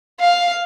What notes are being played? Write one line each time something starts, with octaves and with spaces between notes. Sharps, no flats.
F5